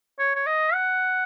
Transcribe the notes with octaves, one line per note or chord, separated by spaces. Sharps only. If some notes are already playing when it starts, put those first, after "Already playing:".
C#5
C#5
D#5
F#5